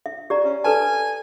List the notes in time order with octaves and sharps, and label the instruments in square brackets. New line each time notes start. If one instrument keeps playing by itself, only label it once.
[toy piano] E5
G4 D5 A#5
[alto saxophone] C#4
[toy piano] A4 B4 A5 [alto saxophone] G#5